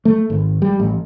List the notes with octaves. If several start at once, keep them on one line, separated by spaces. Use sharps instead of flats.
A3
G#1
G3
A1